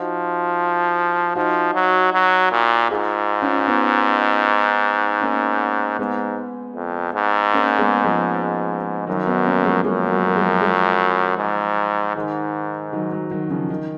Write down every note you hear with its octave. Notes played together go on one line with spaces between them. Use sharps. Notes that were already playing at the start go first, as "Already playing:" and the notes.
Already playing: F3 D#4 F#4
F3 D#4 F#4
F#3
F#3
A#2
G#2 F4 G#4
C#4 F4
B3 D#4
A#3 C#4
G#2 G#3 B3
F2
G#2
A#3 C#4
G#3 B3
F3 G#3
F#2 D#3 F#3
B3 D#4
A#3 C#4
F3 G#3
F#2 F3 G#3
F#3 A#3
A#3
F3 G#3
F3 G#3
G#2
G#2 D#3
D#3 F#3
D#3 F#3
D#3 F#3
C#3 F3
D#3